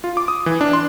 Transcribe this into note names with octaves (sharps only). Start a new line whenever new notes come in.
F4
D6
D#6
E3
D4
C6